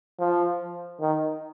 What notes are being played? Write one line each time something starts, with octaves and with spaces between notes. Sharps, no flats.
F3
D#3